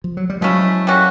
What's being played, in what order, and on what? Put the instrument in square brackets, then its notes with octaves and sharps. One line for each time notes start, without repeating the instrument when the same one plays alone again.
[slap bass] F3
F#3
G3
[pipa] F3 A3 C#4 E4 [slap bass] F#3 G#3
[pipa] G3 A#3 C#4 F#4